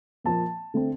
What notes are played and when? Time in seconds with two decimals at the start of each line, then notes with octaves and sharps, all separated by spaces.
0.24 A#2 F3 A#3 A5
0.74 D3 A3 C4